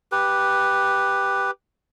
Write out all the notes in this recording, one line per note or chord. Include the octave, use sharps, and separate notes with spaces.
G4 B4